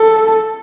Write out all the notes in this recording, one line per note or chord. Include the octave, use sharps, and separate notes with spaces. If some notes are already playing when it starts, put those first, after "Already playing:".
Already playing: A4